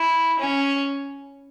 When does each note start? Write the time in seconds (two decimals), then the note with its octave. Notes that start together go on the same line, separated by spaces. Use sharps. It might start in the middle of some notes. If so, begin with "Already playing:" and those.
Already playing: E4
0.39 C#4